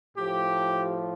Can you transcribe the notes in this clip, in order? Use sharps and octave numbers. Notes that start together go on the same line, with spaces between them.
A2 F3 G4